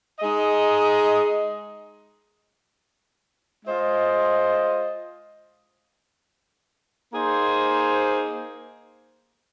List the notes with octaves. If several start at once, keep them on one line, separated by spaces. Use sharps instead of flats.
G#3 D#4 G#4 D#5
G#3 F4 C5 D#5
A#3 D#4 G#4 C5